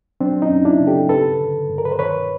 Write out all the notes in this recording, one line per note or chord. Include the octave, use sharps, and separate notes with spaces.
F#3 C4 D4
C#4 D#4
F#2
D4 E4
C#3
G4 A4
G2 A4 B4
D3
G2
A#4
B4
C5
D#3 B4 C#5